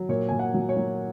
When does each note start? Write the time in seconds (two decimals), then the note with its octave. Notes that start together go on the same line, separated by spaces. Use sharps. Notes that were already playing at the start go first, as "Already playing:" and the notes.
Already playing: F#3
0.09 A#2 C#5
0.29 A#2 G#5
0.39 F#5
0.54 F#3
0.69 C#5
0.77 F#3